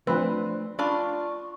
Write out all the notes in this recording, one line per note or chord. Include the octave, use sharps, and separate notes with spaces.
F3 A3 C4 D4 B4
D4 F4 D5 B5 C#6